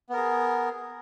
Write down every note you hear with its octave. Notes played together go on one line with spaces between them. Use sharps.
B3 G#4 A#4